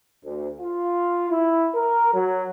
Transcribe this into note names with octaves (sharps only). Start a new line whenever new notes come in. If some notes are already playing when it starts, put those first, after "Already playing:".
D2
F4
E4
A#4
F#3